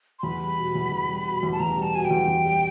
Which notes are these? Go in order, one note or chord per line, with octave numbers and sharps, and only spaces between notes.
C6
E2 B5
G3
B2
E2
E2
G3
B2
E2
A5
E2 A#5
G3
A5
B2 G#5
G5
E2
E2
G3